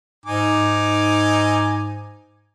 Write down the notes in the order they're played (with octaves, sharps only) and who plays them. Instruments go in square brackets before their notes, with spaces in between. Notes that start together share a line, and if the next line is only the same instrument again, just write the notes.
[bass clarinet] G#2 [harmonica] D#4 G#5 D6